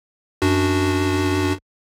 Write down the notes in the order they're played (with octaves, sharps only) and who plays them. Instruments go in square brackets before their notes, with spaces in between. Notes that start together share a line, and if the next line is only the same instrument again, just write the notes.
[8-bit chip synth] F#2 D4 F#4